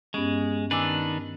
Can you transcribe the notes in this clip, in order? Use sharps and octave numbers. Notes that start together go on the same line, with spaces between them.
G2 G#3 B3 C#4
D#3 D4 B4 G#5 D6 E6